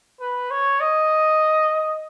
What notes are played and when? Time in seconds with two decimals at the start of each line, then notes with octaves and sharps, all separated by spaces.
0.20 B4
0.51 C#5
0.81 D#5